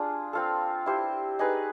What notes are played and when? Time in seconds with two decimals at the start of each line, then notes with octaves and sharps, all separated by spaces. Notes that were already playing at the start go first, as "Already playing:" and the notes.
Already playing: D4 F4 G#4
0.33 C4 F4 A4
0.86 E4 G4 C5
1.39 D#4 G#4 B4